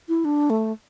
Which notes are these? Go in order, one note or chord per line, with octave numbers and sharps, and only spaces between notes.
E4
D4
A3